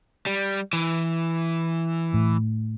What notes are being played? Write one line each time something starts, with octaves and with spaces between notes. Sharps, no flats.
G3
E3
A2